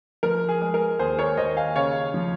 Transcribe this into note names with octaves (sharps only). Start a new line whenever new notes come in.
F3 A#4
G#4
G#3
A#4
D#2 G#4 C5
A#4 C#5
D#2 C5 D#5
F5 G#5
C#3 C#5 F5
F3